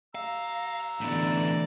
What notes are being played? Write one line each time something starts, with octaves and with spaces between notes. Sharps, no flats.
F5 A#5 E6
A2 D3 E3 B3 D5